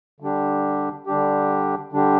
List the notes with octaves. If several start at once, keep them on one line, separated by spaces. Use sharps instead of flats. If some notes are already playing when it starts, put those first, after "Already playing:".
D3 G3 D4 G4
D3 G3 D4 G4
D3 G3 D4 G4